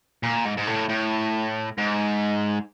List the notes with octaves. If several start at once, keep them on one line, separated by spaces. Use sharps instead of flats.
A#2
G#2
G#2
A2
A2
G#2